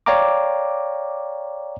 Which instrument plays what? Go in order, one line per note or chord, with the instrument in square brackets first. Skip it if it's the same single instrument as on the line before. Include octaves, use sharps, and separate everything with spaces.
[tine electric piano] C#5 D5 F5 G5 A#5 D6